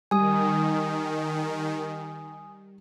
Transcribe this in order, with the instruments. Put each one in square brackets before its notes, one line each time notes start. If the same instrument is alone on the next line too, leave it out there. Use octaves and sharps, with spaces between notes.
[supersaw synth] D#3 [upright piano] G3 [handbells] G#5 D#6